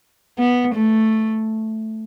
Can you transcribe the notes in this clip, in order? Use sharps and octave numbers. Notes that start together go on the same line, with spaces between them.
B3
A3